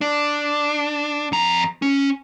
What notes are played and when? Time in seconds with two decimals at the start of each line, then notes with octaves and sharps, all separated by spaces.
0.01 D4
1.32 F2 A#5
1.82 C#4